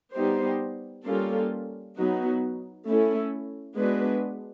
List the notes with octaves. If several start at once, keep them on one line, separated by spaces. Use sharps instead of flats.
G3 B3 D#4 G4 C5
G3 A#3 C#4 F4 A4
F#3 B3 D#4 F#4
A3 C#4 E4 A4
G#3 B3 D4 F#4 B4